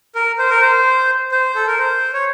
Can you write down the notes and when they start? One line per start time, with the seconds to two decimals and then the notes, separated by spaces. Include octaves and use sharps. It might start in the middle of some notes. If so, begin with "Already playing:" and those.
0.15 A#4
0.39 C5
0.50 A#4
0.61 C5
1.32 C5
1.55 A4
1.67 A#4
1.79 C5
2.13 C#5